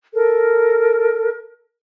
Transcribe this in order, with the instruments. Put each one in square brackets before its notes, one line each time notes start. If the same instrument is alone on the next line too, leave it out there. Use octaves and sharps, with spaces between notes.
[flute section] A4 A#4